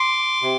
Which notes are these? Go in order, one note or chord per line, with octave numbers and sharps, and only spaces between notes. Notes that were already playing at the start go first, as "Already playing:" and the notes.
Already playing: C6 D6
C3